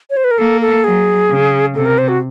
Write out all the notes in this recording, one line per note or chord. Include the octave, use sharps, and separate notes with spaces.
C#5
C5
B4
A#4
A#3 A4
A4
F#3 G#4
C#3
C3 A4
A#4
C5
F#4